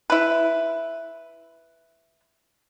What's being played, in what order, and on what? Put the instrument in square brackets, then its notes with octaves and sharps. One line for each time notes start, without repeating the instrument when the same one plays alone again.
[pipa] E4 B4